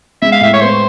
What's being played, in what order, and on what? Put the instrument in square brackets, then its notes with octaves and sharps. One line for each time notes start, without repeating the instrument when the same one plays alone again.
[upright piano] G#3 [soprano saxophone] E5
[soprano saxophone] F5
[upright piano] A2 [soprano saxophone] E5
[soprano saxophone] C#5
[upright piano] B3 [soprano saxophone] C5